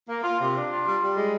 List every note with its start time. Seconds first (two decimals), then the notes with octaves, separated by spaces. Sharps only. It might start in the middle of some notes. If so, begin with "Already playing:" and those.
0.09 A#3
0.23 F4
0.40 C3
0.55 D4
0.70 F4
0.86 G3
1.02 G3
1.16 G#3